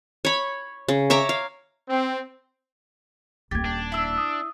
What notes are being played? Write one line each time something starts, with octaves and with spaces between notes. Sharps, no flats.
C#5 B5
C#3
C#5 E5 A#5 D6
F5
C4
D#1 A#3 G4 G#6 A6
D4
E4 E6
D#6